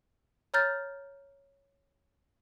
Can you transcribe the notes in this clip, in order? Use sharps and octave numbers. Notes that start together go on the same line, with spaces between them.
C#5 A#5 F6 G6 A6